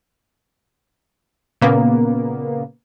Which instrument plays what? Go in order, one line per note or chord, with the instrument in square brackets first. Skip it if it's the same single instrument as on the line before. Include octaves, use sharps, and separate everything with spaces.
[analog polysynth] A#2 C#3 A#3 B3